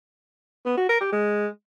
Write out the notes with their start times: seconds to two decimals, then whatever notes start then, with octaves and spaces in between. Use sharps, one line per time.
0.66 B3
0.78 F#4
0.89 A#4
1.01 G4
1.12 G#3